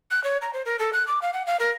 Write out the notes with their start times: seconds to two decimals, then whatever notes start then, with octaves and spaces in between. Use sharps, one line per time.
0.11 F#6
0.24 C#5
0.42 A#5
0.53 C5
0.66 A#4
0.79 A4
0.93 F#6
1.07 D6
1.22 F5
1.33 F#5
1.47 F5
1.60 A#4